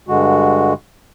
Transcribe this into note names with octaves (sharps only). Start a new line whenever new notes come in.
G2 D3 G#3 F#4